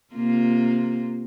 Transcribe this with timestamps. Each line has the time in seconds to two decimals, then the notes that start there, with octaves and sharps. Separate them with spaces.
0.15 C3 A#3 F4